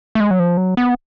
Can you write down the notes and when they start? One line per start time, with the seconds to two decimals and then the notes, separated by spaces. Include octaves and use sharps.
0.15 A3
0.20 G#3
0.31 F#3
0.39 F3
0.57 F#3
0.77 B3